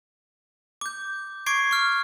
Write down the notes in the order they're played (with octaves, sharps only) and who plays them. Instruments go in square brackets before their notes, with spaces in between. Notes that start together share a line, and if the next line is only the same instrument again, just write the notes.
[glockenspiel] D6 G6
C#6 D6 G#6 C7 D7
C#6 F6